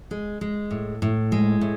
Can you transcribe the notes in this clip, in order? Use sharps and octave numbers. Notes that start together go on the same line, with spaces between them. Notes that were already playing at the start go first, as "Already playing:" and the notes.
G#3
G#3
A2
A2
G#3
A2